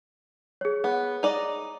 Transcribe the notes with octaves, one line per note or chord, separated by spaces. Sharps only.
G#4 C#5
B3
D#4 D5 D#5